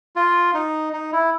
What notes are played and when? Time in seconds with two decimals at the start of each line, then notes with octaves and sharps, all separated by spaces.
0.16 F4
0.54 D#4
0.93 D#4
1.12 E4